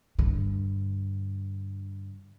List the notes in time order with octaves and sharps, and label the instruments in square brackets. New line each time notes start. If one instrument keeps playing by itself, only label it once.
[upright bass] G2 D3